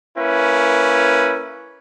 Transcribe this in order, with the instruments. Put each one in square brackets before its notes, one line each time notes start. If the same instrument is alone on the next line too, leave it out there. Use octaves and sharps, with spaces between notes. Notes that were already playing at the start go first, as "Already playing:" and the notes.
[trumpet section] A#3 C#4 E4 B4